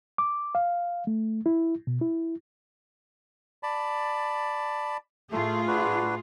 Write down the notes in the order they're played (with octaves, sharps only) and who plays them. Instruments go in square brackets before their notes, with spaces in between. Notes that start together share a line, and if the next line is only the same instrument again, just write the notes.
[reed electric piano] D6
F5
A3
E4
B2
E4
[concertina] D5 A5 B5
[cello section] A2 F4 G#4 [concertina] A3
[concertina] D4 F#4 B4